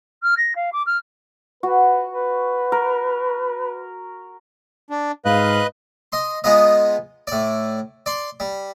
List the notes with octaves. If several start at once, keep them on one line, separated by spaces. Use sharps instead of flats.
F6
A#6
F5
D6
F6
F#4 B4
B4
A#4
D4
G#2 B4 D#5 F5 F#6
D#5 C6
G#3 B3 D#4 F4 D#5
A2 D5
D5 C6
G3